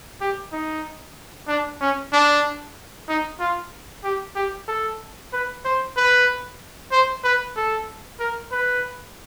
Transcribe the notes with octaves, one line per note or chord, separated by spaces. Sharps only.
G4
D#4
D4
C#4
D4
D#4
F4
G4
G4
A4
B4
C5
B4
C5
B4
A4
A#4
B4